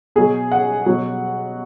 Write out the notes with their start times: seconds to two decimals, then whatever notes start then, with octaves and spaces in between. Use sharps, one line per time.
0.16 B2 F#3 G#4
0.52 F#5
0.86 B2 F#3